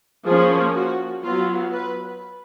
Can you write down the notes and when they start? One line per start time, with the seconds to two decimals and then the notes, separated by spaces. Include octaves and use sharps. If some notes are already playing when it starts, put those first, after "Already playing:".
0.26 F3 A#3 C#4 G#4
0.74 F#4
1.23 F#3 B3 F4
1.72 B4